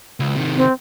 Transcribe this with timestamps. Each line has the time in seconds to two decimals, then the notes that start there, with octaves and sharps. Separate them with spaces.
0.20 C#2
0.35 C3 D#3
0.57 C4